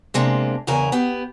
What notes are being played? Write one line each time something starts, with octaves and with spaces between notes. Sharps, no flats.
C3 G#3 A#3 D4
E2 G2 C#3 E4 A#4 G#5
B3 G4